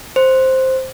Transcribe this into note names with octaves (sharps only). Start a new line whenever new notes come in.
C5